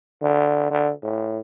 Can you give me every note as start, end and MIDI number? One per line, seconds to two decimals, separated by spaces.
0.22 0.67 50
0.71 0.92 50
1.03 1.39 45